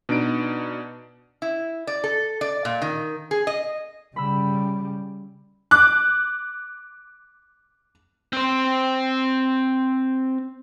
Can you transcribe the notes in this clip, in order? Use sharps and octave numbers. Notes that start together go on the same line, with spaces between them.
B2 D4 D#4 D5 D7
E4
D5
A4
D5
A#2
D#3
G#4
D#5
C#3 G3 B5 E6
D6 F#6
C4 C5